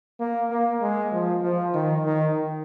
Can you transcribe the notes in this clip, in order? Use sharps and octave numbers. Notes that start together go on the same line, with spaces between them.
A#3
A#3
G#3
F3
F3
D#3
D#3